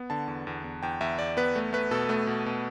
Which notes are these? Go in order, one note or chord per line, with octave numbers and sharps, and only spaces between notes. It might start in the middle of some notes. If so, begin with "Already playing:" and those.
Already playing: B3
D3 A5
E2
E2
E2
E2 G5
E2 E5
E2 D5
B3 B4
A3
A3 B4
B2 A4
A3 B4
B2
B2